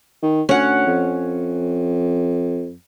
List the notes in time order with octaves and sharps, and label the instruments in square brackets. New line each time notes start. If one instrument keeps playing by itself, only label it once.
[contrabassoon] D#3
[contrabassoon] D2 [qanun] C#4 F#5
[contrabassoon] F2